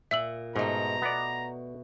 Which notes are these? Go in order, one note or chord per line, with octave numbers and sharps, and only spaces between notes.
A#2 E5 E6 F#7
G#2 B2 A3 A#5
B3 D5